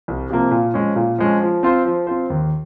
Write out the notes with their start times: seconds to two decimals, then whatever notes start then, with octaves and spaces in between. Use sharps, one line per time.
0.08 C2
0.30 C3 F3 A#3
0.51 A#2
0.74 F3 G#3 C#4
0.96 A#2
1.18 F3 G#3 C#4
1.41 F3
1.63 C4 F4 C5
1.85 F3
2.07 C4 F4 C5
2.30 D#2